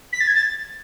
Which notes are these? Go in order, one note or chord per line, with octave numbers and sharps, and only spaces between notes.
B6
A6
G#6
A6